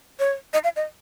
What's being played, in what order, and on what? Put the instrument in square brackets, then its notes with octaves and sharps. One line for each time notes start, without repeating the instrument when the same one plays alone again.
[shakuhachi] C#5
D#5
F5
D#5